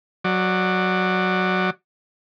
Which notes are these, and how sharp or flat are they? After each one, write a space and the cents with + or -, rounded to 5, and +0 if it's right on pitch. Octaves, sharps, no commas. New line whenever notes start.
F#3 +0 D5 +15